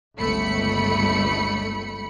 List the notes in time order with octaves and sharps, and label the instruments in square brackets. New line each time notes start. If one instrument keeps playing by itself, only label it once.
[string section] G1 C#2 A3 B5 C#7